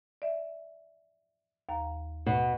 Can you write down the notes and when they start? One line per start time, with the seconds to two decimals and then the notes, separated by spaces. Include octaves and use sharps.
0.22 D5 E5
1.69 D#2 F5 A#5
2.26 B2